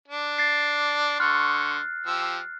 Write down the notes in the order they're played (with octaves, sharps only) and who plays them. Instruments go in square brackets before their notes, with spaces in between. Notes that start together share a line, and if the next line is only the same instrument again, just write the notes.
[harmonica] D4
[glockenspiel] A6 C7
[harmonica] D3 C6 C#6 [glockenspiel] F6 F#6
[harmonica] F3 G4 E6